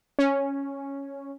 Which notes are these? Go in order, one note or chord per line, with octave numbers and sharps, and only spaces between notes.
C#4